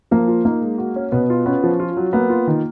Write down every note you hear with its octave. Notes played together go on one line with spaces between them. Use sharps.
F3 A#3
F4
A#3 D#4
G#3
F#4
C#4
B2 B3
F4
B3 C#4
F3
F4
F#3
A#3 B3
F4
D#3